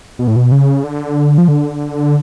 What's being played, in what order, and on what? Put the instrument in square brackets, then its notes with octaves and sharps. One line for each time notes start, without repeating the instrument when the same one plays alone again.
[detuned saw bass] B2
A2
B2
C#3
D3
F3
D3